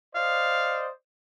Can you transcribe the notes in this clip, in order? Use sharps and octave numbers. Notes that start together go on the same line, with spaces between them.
C5 D5 D#5 F5